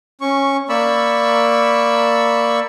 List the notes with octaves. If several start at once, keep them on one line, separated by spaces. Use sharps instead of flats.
C#4 C#6
A#3 D5 B5 C#6 E6